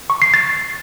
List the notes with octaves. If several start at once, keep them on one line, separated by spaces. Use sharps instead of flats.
C#6
C7
A6